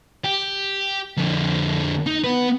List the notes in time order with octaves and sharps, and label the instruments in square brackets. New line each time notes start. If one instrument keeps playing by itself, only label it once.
[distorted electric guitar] G4
F2 D3
D#4
B3 B4